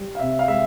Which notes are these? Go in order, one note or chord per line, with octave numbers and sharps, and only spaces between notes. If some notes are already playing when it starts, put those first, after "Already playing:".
Already playing: G3
F5
C3 E5
F5
G#3 E5